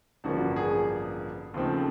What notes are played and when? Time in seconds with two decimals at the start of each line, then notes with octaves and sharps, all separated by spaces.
0.24 A1 G2 D3 F3 A#3 F#4
0.56 G#4
1.54 D#2 C#3 F3 A3 C4